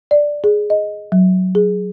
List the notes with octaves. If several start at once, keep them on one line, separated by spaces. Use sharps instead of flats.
D5
G#4
D#5
F#3
G#4